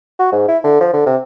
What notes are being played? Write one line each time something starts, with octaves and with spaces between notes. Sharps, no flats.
F#4
G#2
E4
D3
F3
D3
C3